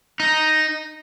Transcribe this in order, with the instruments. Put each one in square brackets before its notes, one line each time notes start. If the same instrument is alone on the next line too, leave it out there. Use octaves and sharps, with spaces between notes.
[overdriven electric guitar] D#4